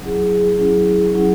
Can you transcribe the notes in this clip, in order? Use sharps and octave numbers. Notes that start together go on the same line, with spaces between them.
F#3 C#4 E4 G#4
F#3 C#4 E4 G#4
F#3 C#4 E4 G#4